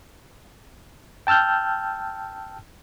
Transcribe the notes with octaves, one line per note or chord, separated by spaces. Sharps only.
G5 A5 E6 F6 G6